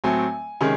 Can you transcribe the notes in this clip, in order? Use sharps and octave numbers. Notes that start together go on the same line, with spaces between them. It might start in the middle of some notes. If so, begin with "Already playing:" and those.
A2 F#3 A3 C4 G#5
C3 D#3 G#3 C#4